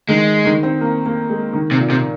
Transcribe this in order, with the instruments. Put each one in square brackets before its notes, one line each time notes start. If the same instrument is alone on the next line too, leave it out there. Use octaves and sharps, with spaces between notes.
[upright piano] D#3 [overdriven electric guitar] G#3
[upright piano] D#3
C4
A#3
A#3
G#3
D#3
[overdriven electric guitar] C3
[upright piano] A#2
[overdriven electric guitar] C3